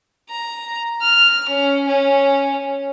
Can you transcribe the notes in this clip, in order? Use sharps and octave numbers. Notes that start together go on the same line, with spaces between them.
A#5
F6
C#4
C#4